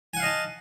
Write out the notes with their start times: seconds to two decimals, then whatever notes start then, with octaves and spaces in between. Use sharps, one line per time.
0.14 G#5
0.17 F#5
0.20 F5
0.23 D#5
0.26 A5